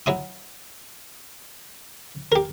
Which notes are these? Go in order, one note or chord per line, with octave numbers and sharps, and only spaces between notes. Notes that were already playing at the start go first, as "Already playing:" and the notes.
F#3 E4 D#6
G4 A#4